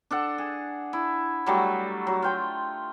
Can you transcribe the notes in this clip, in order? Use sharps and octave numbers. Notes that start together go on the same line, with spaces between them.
D4 A4 F#5
G#4
E4
F#3 G3 A3
F#3
F4 G5 C6